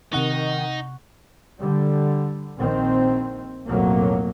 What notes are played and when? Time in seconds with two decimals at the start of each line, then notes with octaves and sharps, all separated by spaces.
0.13 C3 D#3 D#4 F#5 C#6
1.59 D3 G3
2.57 A#1 D#3 C4
3.67 B1 F2 A2 F#3 A#3